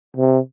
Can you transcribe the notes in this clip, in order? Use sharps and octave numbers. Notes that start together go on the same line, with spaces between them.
C3